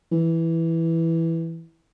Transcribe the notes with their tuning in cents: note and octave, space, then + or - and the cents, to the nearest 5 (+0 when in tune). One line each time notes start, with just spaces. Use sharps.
E3 +0